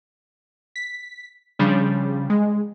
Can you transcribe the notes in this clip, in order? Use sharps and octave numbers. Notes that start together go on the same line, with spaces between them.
B6
C#3 F3 G3 D4
G#3